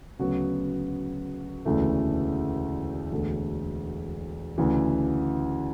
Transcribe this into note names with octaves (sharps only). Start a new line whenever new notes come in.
D2 C#3 F#3 B3 F#4
E1 D2 C#3 E3 A3
E1 D2 D3 A3
D2 C#3 E3